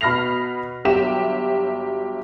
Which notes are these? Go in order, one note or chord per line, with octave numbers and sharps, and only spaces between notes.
B2 B5 F6 A#6 C7 F7
G1 F#3 G4 E5 E7